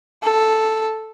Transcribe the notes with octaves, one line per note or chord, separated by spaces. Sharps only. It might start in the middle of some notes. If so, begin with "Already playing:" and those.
A4